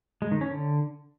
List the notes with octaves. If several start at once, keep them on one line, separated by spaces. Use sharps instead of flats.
G#3
D#3
C#4
D3